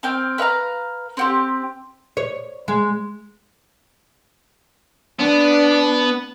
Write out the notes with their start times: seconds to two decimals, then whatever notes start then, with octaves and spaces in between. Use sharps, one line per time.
0.03 C4 G5 F6
0.38 B4 E5 F5 A#5
1.17 C4 F#4 G4
2.17 C#5
2.68 G#3
5.19 B3 D4